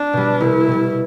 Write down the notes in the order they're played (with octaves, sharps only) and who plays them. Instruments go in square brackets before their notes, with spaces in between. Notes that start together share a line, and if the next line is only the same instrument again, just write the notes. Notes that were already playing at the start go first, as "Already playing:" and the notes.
Already playing: [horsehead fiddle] D4
[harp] B2 G3
[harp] C2 [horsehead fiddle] E4
[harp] B2 G3